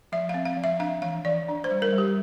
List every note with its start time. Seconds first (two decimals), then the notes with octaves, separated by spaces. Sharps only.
0.12 F3 E5
0.29 F5
0.34 C4
0.45 F5
0.57 F3
0.64 E5
0.79 D4 F5
1.02 E3 F5
1.25 E3 D5
1.48 D4
1.64 C5
1.71 G3
1.82 A#4
1.93 G3
1.98 G4